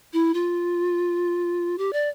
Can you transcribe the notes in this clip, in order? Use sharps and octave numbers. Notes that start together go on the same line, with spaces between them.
E4
F4
G4
D5